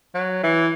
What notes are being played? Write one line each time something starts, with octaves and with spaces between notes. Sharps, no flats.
F#3
E3